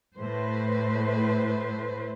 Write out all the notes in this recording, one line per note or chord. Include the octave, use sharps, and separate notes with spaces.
A2 A3 B4 C5